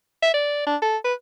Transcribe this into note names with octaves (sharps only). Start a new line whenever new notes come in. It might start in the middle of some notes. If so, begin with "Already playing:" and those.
E5
D5
D4
A4
B4